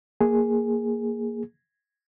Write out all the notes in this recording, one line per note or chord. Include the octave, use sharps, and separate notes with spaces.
A#3 G#4